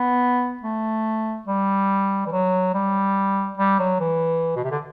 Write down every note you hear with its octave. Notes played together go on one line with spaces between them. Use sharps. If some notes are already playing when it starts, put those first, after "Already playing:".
Already playing: B3
A3
G3
E3
F#3
G3
G3
F#3
E3
B2
C3
D3